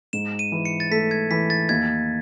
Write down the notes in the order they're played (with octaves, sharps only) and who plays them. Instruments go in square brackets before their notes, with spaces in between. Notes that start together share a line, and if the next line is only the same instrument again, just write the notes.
[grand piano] G#2 [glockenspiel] E7
[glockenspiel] D#7
[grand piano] E3
[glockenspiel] C#7
A6
[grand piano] A3 [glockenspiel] B6
[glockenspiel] G#6
[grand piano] E3 [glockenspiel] B6
[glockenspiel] A6
[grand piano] D#2 [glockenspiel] G#6